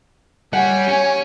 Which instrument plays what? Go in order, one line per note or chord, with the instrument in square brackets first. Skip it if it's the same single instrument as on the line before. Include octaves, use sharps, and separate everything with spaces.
[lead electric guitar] G3 [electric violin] C#5 G#5 [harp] F#5
[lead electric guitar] C#4